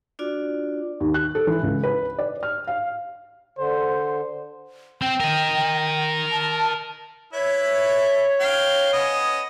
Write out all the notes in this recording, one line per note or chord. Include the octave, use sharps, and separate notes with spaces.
D4 F4 F#4 D5
D#2
F#6
A4
E3
C#2
B4
D5
F6
F5
D3 C5
C4 G5
A#4 D#5
A5
E4 B4 C#5 E5
F5 G5
B3 C#4 D#5